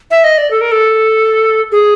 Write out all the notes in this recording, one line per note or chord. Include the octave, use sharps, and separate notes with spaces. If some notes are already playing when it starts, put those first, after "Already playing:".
E5
D#5
D5
A4
A#4
A4
G#4